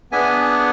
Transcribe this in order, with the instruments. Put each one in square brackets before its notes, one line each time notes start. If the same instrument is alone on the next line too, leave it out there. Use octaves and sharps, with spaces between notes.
[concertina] B3 D4 G#4 E5 G#5